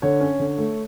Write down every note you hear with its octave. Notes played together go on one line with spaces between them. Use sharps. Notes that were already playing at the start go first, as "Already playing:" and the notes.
D3 C#5
C#4
D3
A3